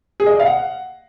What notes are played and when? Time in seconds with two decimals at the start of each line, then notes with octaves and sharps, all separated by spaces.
0.20 G#4
0.26 D#5
0.33 D5
0.40 F5
0.46 F#5